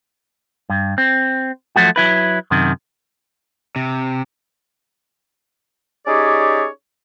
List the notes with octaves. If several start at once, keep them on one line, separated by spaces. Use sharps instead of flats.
G2
C4
F3 F#3 A3 F#4
F#3 E4 B4
F#2 C3 D#3
C3
C#4 D#4 G4 G#4 C#5 D5